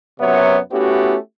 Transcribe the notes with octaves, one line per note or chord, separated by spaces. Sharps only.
F#2 C3 F#3 B3 C#5 E5
A3 B3 C#4 E4 F#4 G4